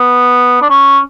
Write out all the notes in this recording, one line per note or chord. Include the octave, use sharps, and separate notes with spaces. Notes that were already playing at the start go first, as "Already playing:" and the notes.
Already playing: B3
D4
C#4